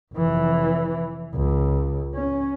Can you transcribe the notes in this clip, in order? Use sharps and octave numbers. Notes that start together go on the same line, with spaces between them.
F1 E3
C#2
C#4